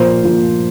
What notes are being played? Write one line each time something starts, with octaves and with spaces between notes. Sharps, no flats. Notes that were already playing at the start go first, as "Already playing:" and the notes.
Already playing: A#2 F3 A#3 C5
A#2 F3 A#3